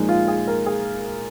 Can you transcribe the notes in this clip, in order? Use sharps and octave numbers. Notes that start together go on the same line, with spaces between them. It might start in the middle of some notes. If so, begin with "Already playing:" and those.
Already playing: A#2 F3 G#3 D#4
F4
G#4
A#4
G#4